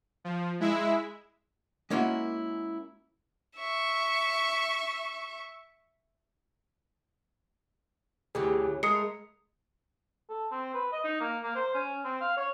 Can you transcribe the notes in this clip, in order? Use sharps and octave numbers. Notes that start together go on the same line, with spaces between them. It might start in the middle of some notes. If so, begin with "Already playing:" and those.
F3
G#3 E4 E5
G#3 A#3 C#4 E4 F#4
E5 C#6
D2 C#3 E3 F#3 G4 G#4
A2 G#3 A3 A#4 D#6 C7 C#7
A4
C4
B4
D#5
D#4
A#3
A#3
C5
C#4
C4
F5
C#5